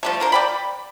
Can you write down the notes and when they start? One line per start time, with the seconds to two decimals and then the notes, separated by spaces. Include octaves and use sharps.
0.03 F3 G3 A3
0.20 D3 A#4 C5
0.32 D5 G5 B5